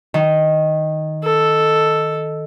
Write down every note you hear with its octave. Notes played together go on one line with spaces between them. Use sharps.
D#3
A4